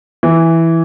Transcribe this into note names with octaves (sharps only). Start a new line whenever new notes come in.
E3